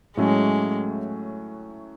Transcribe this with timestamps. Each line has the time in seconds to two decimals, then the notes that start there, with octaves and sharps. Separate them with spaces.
0.17 A2 F#3 G#3 A3 C#4